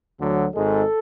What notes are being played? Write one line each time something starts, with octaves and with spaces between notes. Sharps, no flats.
D2 D3 F#3
G#1 G#2 G#3 A4